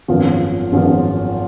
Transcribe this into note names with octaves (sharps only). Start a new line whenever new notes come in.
G#1 F#2 F3 B3 F4
G#1 F#2 F3 B3 F4